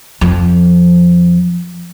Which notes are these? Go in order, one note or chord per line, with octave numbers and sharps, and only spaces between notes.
F2 F3